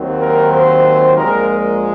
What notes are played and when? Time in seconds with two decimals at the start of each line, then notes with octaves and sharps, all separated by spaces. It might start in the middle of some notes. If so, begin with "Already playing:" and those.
Already playing: D#2 D#3 F#3 C4
0.21 A#4
0.53 C5
1.17 A#1 A#2 G#3 A#4
1.49 A#4